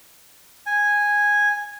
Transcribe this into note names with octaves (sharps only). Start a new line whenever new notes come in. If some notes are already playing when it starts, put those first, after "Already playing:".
G#5